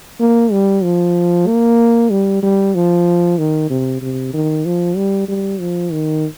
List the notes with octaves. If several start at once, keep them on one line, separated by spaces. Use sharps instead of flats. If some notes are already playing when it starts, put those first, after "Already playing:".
A#3
G3
F3
A#3
G3
G3
F3
D#3
C3
C3
D#3
F3
G3
G3
F3
D#3